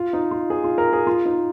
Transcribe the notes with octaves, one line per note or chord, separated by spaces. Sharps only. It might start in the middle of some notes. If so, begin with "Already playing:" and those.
Already playing: F4
D#4
F4
G#4
F4
A#4
G#4
F4
D#4